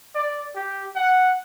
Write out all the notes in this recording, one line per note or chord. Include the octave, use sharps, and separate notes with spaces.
D5
G4
F#5